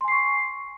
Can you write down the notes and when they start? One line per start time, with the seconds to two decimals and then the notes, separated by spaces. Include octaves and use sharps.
0.01 C6
0.04 G#5
0.08 C7
0.12 C#6